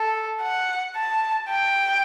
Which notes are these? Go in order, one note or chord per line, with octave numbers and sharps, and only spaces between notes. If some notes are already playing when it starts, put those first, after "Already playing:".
Already playing: A4
F#5
A5
G5